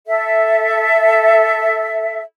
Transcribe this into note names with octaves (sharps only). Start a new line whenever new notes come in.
A4 E5